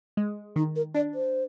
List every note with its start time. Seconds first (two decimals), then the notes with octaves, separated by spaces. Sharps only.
0.17 G#3
0.56 D#3 D#4
0.76 A#4
0.95 D4 D5
1.14 C5